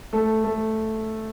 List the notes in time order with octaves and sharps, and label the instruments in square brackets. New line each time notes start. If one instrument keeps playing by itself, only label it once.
[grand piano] A3 A4
A3 A4